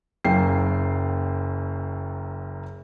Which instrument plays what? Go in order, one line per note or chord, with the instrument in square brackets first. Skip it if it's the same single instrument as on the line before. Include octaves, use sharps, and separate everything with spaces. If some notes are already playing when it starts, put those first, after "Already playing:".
[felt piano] F#1 F#2 A#3 G5 C7